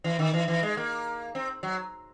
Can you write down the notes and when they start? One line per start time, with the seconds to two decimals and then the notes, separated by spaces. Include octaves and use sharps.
0.04 E3
0.19 D#3
0.34 E3
0.48 E3
0.63 G#3
0.77 A#3
1.35 C4
1.63 F#3